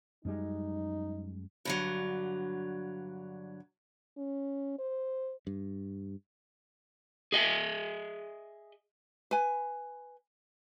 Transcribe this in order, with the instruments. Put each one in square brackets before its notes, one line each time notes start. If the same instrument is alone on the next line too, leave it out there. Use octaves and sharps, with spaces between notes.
[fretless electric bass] F#2 G3 G#3 [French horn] D#4
[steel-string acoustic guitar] G2 D3 F#3
[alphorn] C#4
C5
[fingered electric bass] G2
[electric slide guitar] G#4 D#5 E5
[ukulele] B4 G#5